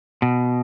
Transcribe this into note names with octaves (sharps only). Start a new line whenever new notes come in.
B2